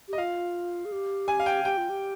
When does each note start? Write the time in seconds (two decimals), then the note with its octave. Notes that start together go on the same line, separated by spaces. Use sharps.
0.08 G4 D#5
0.18 F4 F5
0.85 G#4
0.92 G4
1.28 G#5
1.40 F5
1.46 G5
1.65 G4 G5
1.77 F4
1.89 G4